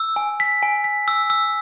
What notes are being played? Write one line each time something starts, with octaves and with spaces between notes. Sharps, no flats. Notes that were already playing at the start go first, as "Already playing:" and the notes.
Already playing: E6
G#5
B6
G#5
B6
E6
E6